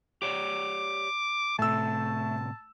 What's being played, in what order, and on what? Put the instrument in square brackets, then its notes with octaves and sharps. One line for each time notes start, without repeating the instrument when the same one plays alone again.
[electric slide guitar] G4 C#5 D5 [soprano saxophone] D6
[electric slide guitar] A2 C3 [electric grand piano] A3 E6 [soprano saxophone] A5